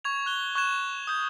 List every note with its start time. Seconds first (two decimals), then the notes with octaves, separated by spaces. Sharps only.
0.04 C#6 G#6 F7
0.26 F#6 G7
0.55 C#6 F#6 G#6 E7
1.07 D#6 G6